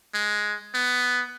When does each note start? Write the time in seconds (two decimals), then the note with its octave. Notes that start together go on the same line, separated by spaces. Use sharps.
0.14 G#3
0.74 B3